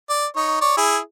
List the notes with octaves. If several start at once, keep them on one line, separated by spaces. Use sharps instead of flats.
D5
D#4 C#5
C#5 D5
E4 G#4